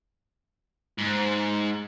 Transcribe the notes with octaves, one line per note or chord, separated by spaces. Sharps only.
G#2